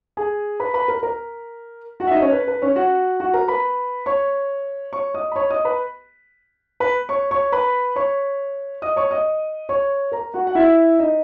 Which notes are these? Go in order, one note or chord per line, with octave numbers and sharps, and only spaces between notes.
G#4 G#5
B4 B5
B4 B5
A#4 A#5
A#4 A#5
F#4 F#5
E5
D#4 D#5
C#4 C#5
B4
B4
C#4 C#5
F#4 F#5
F#4 F#5
A#4 A#5
B4 B5
C#5 C#6
C#5 C#6
D#5 D#6
B5
C#5 C#6
D#5 D#6
B4 B5
B4 B5
C#5 C#6
C#5 C#6
B4 B5
C#5 C#6
D#5 D#6
C#5 C#6
D#5 D#6
C#5 C#6
A#4 A#5
F#4 F#5
F#5
E4 E5
D#4 D#5